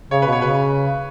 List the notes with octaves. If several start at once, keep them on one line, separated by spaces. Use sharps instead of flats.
C#3 C#5
B2 B4
C#5
C#3 B4